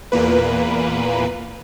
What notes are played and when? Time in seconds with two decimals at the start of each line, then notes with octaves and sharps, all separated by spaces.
0.12 E2 A#2 A#3 B4